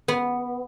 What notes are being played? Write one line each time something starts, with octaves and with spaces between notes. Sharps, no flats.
B3